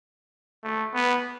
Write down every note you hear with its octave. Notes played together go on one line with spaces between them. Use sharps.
A3
B3